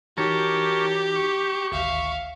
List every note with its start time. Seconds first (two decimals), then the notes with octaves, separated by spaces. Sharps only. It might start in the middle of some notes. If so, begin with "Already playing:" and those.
0.18 E3 D#4 F#4 G4 A#4 C#5 A5
1.16 C#6
1.72 G#1 D2 E5 F5